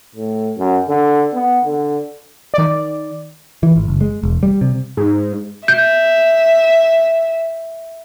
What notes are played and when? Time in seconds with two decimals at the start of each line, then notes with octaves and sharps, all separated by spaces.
0.15 A2
0.58 F#2
0.89 D3
1.34 B3
1.65 D3
2.54 D#3 D5
3.63 E3
3.76 G#1
3.88 F#1
4.01 G#3
4.23 E1
4.43 G3
4.61 C3
4.97 G#2
5.68 E5 G6